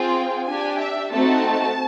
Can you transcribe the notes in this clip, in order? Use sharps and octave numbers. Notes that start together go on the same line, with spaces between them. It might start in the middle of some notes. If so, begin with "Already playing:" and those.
Already playing: C4 F4 G#4 G5
D4 G4 G#5
E5
A3 C4 D#4 F#4 A5